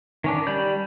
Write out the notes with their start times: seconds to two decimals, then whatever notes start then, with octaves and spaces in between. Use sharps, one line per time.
0.24 D#3 C#4 D4
0.47 G3 D5 B5 G6